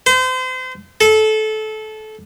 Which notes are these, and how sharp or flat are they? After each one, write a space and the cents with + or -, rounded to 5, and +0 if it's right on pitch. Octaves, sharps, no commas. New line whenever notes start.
C5 -35
A4 -20